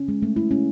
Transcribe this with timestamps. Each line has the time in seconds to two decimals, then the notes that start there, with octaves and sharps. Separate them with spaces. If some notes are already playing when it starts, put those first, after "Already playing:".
Already playing: C#4
0.08 G#3
0.22 A3
0.36 E4
0.51 C#4